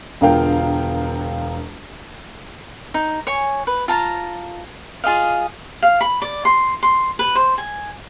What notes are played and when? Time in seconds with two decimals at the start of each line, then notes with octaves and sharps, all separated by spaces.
0.21 E1 D3 F4 A#4 F5 G5
2.94 D#4
3.27 C#5 G#5
3.67 B4
3.88 F4 A5 A#5
5.04 F4 G#4 D#5 F5
5.82 F5
6.01 B5
6.22 D5
6.45 C6
6.83 C6
7.19 B4
7.35 C5
7.58 G#5